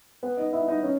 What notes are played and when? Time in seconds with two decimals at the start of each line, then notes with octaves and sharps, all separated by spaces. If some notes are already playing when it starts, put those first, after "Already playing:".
0.23 B3 B4
0.37 D#4 D#5
0.53 E4 E5
0.68 D#4 D#5
0.83 C#4 C#5